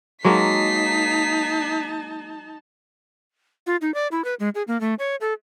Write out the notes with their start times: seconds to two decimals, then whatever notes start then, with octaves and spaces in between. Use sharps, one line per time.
0.25 F#3 G#3 A#3 D#4 A5 B6 C7
3.67 F4
3.81 D#4
3.94 D5
4.12 E4
4.25 B4
4.40 G#3
4.55 G#4
4.68 A#3
4.81 A3
4.99 C#5
5.21 A4